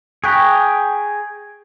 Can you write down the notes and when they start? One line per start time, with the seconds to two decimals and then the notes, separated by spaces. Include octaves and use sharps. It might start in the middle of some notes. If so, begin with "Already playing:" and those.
0.24 G#4 G5 A#5 C#6 F#6 B6